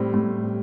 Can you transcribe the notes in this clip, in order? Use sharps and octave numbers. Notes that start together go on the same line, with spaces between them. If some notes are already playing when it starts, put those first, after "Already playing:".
Already playing: A2 G3 C4
A2
G3